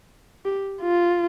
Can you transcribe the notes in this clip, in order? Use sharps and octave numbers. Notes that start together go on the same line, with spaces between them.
G4
F4